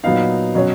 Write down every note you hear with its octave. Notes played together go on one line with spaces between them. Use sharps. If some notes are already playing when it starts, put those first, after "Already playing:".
A#2 F#3 B3 D#4 F5
B2 F#3 C#4